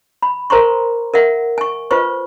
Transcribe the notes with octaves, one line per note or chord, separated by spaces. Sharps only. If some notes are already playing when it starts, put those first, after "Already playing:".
B5
A#4 C5 A#5 C6 C#6
A#4 E5 F#5
G#5 C#6
F4 B4 C5 C#6